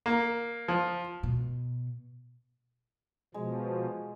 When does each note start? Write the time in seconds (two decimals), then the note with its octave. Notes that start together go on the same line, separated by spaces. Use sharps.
0.06 A#3
0.68 F3
1.23 B2
3.34 B2 F3 G#3